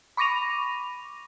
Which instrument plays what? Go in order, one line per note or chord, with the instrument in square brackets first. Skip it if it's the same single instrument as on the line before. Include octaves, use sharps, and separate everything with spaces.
[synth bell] B5 C#6 D6 A#6 D#7 F7